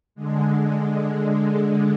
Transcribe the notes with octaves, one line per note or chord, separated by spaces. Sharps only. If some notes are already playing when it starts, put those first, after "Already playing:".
D3 G#3